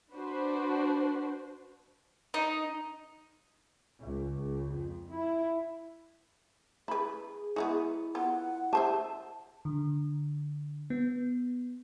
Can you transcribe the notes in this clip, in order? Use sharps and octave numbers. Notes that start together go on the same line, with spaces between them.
D4 F#4 B4 C5
D#4
C#2
C#2
F2
E4
E4 G#4 B4 B5
G#3 A#3 B3 E4
B3 F4 F#5
G4 C5 E5 A5
D3
B3